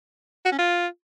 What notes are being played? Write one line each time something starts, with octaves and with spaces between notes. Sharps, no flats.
F#4
C#4
F4